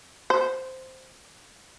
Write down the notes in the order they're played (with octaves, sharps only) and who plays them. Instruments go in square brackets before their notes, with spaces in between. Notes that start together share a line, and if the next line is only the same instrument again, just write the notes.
[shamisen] C5